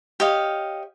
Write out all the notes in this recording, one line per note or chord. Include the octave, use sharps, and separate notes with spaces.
G4 C#5 D#5 F5